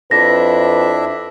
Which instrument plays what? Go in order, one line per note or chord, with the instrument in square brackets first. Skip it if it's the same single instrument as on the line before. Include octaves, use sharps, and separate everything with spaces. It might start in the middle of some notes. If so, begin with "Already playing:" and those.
[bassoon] F2 [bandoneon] D4 E4 E5 [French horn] B4 [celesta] A#6